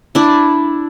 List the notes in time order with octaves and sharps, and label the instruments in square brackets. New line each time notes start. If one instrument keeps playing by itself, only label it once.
[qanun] D4 E4